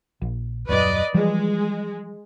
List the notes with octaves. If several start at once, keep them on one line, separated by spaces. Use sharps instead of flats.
A#1
D#1 F#2 B4 D5 D#5
E3 F3 G3 G#3